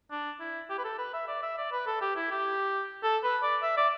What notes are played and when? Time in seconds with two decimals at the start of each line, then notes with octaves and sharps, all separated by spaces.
0.11 D4
0.40 E4
0.70 G4
0.78 B4
0.84 A4
0.99 B4
1.14 E5
1.28 D5
1.43 E5
1.57 D5
1.72 B4
1.87 A4
2.02 G4
2.16 E4
2.31 G4
3.04 A4
3.24 B4
3.43 D5
3.63 E5
3.77 D5